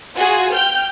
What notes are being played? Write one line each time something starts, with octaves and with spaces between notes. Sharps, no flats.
F4 F#4 G#4 G#5
G5 F6 G6